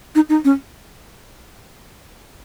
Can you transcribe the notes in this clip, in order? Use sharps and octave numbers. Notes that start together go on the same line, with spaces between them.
D#4
D#4
C#4